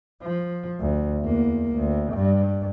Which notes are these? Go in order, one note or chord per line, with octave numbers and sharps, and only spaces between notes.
F3
D2
E2 A#3
D2
G2